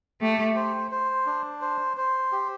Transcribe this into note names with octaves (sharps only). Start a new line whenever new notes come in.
A3 G4
C5
C5
D4
C5
C5
G4